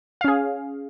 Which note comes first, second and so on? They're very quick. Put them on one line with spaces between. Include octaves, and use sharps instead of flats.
F5 C#4 G#4